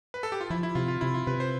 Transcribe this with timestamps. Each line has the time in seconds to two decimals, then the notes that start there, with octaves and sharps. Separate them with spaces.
0.14 B4
0.23 A4
0.32 G4
0.41 F4
0.50 F3 E4
0.63 E4
0.75 C3 F4
0.88 F4
1.01 C3 E4
1.14 F4
1.27 C3 B4
1.40 C5